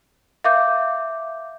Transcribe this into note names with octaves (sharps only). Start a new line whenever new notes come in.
E5 F5 D6 G6